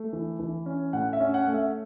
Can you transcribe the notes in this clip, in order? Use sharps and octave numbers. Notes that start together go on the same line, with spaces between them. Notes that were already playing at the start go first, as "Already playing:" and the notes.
Already playing: A3
E3
E3
C#4
A2 F#5
E5
C#4
F#5
A3
E5